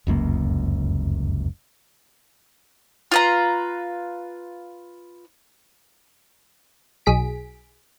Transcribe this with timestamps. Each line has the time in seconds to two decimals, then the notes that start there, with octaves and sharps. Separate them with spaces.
0.07 F1 C#2 F#2 A#3
3.12 F4 B4 A#5
7.06 B1 G#4 B6 D7